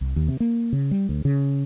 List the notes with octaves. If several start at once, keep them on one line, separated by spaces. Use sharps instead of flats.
C2
D#2
C3
A#3
C#3
G3
D2
C#3